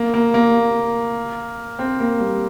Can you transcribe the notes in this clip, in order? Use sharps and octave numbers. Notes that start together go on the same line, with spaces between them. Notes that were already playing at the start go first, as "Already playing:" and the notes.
Already playing: A#3
A#3
A#3
C4
A#3
G3